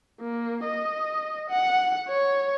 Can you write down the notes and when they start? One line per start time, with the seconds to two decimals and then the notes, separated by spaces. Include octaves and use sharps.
0.21 A#3
0.65 D#5
1.50 F#5
2.08 C#5